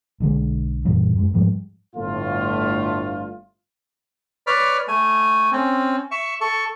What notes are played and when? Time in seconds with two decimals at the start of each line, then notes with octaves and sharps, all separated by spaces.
0.20 B1 D3 G#3
0.85 F#2 A#2 E3 G3
1.15 F#2 G#3
1.34 G#2 F3 G3 G#3
1.96 G1 A2 D3 A3 F4
4.47 B4 C#5 D5 B5 F6
4.88 A3 G#5
5.52 C4 C#4
6.11 E5 C#6
6.41 A4 C#6